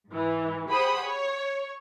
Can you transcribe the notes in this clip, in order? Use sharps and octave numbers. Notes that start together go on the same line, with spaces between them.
G#2 E3
G4 G#4 C5 F#5 B5 D#6
C#5